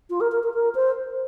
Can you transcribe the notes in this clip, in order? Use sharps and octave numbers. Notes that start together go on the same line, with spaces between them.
F4
A#4
A#4
A#4
A#4
C5